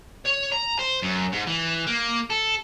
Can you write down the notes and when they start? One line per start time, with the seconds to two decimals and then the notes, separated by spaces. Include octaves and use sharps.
0.25 C#5
0.52 A#5
0.79 C5
1.02 F#2
1.33 G#2
1.47 E3
1.87 A#3
2.30 A4